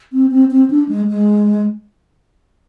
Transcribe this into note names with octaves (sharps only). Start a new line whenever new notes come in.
C4
C4
C4
D4
G#3
G#3